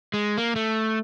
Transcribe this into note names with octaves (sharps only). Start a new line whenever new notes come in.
G#3
A#3
A3